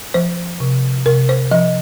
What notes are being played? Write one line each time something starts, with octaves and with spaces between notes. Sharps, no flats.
F3 C5
C3
C3 A#4
C5
F3 D#5